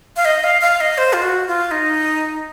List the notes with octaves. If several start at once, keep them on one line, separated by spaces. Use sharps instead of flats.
F5
D#5
F5
F5
D#5
C5
F4
F#4
F4
D#4